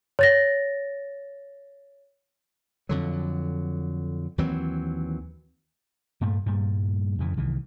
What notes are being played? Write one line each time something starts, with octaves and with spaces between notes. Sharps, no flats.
C#5 A6 A#6
F2 D3 F#3
D#2 E3 F#3 C4
G2 A#2 A3
G2 A#2 G3
F2 C#3 E3
C2 D#3 E3